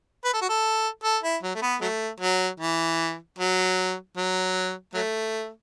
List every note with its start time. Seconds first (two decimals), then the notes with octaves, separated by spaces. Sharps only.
0.25 B4
0.34 A4
0.42 F#4
0.49 A4
1.04 A4
1.23 E4
1.43 F#3
1.55 A3
1.62 B3
1.81 F#3 A3
2.20 F#3
2.60 E3
3.39 F#3
4.17 F#3
4.94 F#3 A3